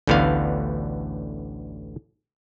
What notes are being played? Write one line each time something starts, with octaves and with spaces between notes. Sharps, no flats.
A1 D2 A2 D3 B3 F5